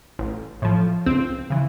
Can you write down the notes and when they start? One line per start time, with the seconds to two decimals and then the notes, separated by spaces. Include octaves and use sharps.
0.19 A1
0.62 A2 F3
1.06 C#2 C4
1.50 C#3 E3